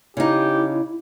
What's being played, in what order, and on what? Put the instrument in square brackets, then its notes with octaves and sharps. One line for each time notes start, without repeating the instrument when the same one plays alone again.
[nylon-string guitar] C#3 D#4 [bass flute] E4 [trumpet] G4